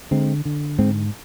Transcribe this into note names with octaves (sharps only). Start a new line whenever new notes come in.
D3 G#3 C4
D3
G#2 G#3 C4